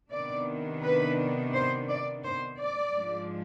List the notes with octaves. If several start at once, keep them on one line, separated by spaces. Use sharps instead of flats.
C3 D#3 B3 D4 D5
B4
C5
D5
C5
D5
G#2 F3 G#3 D4